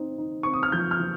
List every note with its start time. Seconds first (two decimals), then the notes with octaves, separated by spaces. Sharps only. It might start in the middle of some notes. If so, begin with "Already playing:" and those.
Already playing: C4 D#4
0.18 D#4
0.43 C4 C#6
0.53 D#6
0.63 F6
0.72 F3 G6
0.91 F6
1.00 F3